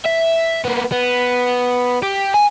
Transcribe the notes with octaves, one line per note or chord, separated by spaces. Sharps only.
E5
A#3 B3
B3
G4
G#5